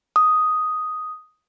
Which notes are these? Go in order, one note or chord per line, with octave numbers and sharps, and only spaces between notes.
D#6